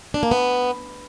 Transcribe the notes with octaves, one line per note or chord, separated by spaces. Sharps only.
D4
A#3
B3